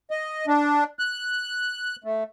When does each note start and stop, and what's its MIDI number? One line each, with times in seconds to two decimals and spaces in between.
0.11 0.46 75
0.47 0.84 62
0.99 1.96 90
2.04 2.23 57